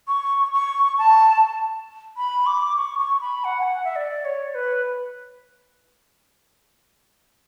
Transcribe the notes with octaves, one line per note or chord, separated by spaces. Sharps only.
C#6
C#6
A5
B5
D6
C#6
C#6
B5
F#5
G#5
F#5
E5
D5
C#5
B4